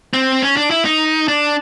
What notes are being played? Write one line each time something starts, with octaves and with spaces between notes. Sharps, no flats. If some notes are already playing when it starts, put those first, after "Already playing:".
C4
C#4
D4
E4
D#4
D4